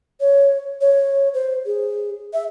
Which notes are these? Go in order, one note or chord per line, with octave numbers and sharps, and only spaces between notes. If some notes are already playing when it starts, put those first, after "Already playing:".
C#5
C#5
C5
G#4
E5